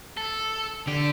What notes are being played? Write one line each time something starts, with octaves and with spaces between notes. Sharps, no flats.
A4
D3 G4